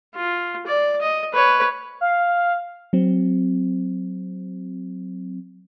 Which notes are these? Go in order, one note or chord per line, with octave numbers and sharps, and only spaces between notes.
F4
D5
D#5
B4 C#5
F5
F#3 C4